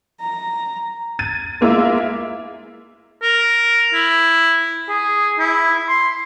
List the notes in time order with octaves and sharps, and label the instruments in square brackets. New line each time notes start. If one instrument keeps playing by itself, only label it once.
[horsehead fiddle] A#5
[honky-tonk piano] G#6 A6 D#7
G#3 A#3 E4 F4 E5 F5
[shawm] A#4
E4
G#4
E4
C6